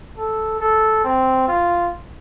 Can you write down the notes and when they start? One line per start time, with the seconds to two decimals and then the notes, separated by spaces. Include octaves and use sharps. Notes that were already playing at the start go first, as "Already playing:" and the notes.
0.18 A4
0.60 A4
1.04 C4
1.48 F4